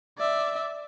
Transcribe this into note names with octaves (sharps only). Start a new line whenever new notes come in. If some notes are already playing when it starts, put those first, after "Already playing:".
D5 E5